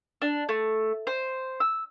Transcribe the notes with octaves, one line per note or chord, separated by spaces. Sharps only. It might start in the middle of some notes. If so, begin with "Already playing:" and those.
D4
A3
C5
E6